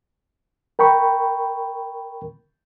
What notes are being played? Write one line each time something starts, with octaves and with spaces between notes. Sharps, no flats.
A#4 G5 B5 C#6